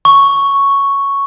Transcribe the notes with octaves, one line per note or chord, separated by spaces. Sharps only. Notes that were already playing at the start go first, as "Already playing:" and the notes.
C#6